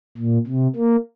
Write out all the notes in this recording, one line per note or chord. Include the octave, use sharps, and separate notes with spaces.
A#2
C3
A#3